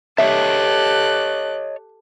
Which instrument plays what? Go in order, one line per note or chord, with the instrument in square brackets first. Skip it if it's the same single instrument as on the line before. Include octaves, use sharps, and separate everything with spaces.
[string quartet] G4 A4 F#6 [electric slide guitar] C#5 D#5 A5 [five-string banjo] E5